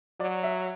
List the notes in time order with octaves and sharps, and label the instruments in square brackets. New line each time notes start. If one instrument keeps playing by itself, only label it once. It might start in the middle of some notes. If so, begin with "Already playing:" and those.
[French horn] F#3 [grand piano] D5
[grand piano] E5